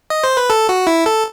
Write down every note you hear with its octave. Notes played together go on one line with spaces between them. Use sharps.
D#5
C5
B4
A4
F#4
E4
A4